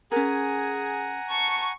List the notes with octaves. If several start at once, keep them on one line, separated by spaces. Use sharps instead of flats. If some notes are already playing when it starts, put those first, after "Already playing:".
C#4 G#4 A#4 F#5 G#5 A#5
A5 C#6